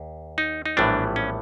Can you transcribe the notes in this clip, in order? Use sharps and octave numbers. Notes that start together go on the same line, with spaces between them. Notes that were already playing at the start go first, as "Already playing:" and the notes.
Already playing: D#2
D#4
D#4
A#1 A2 E3 G3 B3 D4
C#4